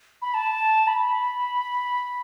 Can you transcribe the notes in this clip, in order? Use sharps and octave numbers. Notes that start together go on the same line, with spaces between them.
B5
A5
B5